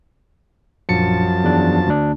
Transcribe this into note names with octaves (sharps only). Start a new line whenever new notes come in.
A#1 F#2 F3 A5 C#7
E2 D4
D2 D4